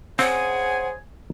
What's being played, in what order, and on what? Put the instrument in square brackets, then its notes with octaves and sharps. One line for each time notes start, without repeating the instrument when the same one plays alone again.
[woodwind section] C#3 G#4 G#5 [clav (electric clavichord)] C4 [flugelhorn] C5 [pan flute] F#5